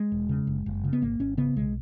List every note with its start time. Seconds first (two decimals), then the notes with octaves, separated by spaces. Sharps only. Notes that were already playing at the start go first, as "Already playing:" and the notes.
Already playing: G#3
0.12 E1
0.29 C#3
0.47 F#1
0.66 F#1
0.84 C#3
0.93 B3
1.02 G#1 A#3
1.20 G#1 C#4
1.37 C#3 B3
1.56 B1 G#3